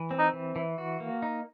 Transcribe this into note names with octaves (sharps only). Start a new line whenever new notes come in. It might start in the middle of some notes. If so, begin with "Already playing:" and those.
Already playing: E3
C4
D#4
E3
E3
F#4
A#3
D#4